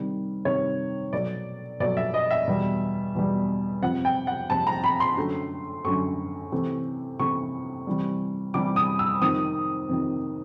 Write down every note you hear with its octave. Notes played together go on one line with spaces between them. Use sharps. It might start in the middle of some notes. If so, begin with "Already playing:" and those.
Already playing: C3 D#3 G3
C3 D#3 G3 C#5
B2 F#3 A3 D5
B2 F#3 A3 D5
E5
D#5
E5
E2 B2 G3
E2 B2 G3
F2 C3 F3 F#5
G5
F#5
F2 C3 F3 A5
A#5
B5
C6
F#2 D3 F#3 A3
F#2 D3 F#3 A3 C#6
C3 E3 A3
C3 E3 A3 C#6
C3 E3 G3
C3 E3 G3 D6
D#6
E6
F2 C3 D#3 D#6
F2 C3 D#3